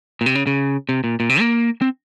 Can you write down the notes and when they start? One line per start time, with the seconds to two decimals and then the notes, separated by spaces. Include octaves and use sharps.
0.21 A#2
0.26 C3
0.35 C#3
0.47 C#3
0.89 C3
1.04 A#2
1.20 A#2
1.29 C3
1.40 A#3
1.81 C4